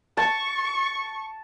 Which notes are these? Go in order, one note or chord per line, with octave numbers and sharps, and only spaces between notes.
A5 C#6